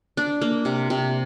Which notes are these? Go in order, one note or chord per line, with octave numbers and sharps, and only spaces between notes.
D4
A#3
C3
C3